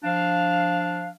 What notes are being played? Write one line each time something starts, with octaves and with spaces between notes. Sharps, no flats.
F3 D4 F5